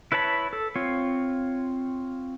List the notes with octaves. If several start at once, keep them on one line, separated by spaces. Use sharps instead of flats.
E4 B4 C#5 A5 B5
A4
C4 F4 C#5